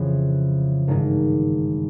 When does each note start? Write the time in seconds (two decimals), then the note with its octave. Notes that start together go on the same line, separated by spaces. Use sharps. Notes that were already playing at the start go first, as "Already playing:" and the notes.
Already playing: F2 C#3 E3
0.88 G#1 G2 D#3 G#3